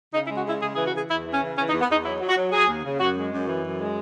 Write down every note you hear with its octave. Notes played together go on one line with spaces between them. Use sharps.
C#3 D#4
E4
G#3
F#4
C#3 E4
C#3 G#4
G#4
E3
F#4
E3 G#4
E2 E4
E3
C#4
C#3
E3 C#4
D#4
E2
B3
E2 D#4
F#3 E4
F#3
F#4
F#3
F#3 G#4
D#2
C#3
F#2 F#4
G#3
F#2
E3
F#2
G#3